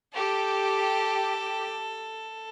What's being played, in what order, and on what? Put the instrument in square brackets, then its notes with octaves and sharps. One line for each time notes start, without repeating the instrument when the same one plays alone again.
[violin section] G4 [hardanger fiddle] A4